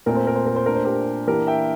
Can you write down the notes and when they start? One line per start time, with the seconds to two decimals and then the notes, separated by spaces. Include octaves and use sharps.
0.06 A#2 A3 C4 A#4
0.16 C5
0.27 A#4
0.36 C5
0.46 A#4
0.56 C5
0.66 A#2 A3 D4 A#4
0.75 C5
0.84 G4 A#4
1.27 E3 A#3 D4 G4 A#4
1.47 E5 G5